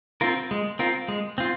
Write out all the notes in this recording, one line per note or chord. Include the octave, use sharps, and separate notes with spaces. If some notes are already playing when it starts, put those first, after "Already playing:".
C4 F4 A#4
G#3
C4 F4 A#4
G#3
C4 F4